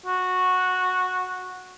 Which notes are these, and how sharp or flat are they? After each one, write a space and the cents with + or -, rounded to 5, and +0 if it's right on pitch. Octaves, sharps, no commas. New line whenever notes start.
F#4 -10